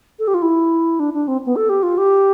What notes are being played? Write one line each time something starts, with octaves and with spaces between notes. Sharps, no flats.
A4
G4
F4
E4
D4
D4
C4
B3
A4
G4
F4
G4